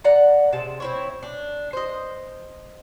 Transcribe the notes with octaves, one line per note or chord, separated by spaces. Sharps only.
D5 F#5 A#5
C3 G#3 A5
C4 E4 C#5
D4
C5 D#5